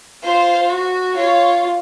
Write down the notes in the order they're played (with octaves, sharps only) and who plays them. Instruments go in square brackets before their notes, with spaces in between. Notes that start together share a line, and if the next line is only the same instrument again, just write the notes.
[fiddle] F4 [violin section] C5
[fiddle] F#4
[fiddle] F4 [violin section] C#5